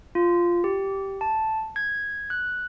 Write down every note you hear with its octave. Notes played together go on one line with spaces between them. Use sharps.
F4
G4
A5
G#6
F#6